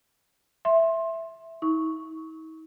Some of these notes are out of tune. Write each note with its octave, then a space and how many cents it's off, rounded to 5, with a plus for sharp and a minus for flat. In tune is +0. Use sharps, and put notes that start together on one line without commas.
E5 +0 C6 +20
D#4 +45 C#6 +0